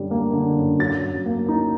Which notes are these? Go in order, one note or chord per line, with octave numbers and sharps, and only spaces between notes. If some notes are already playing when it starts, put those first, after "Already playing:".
Already playing: F#2 D3 G3
A#3
D3
F#2
F#3 A6
F#2
A#3
D#4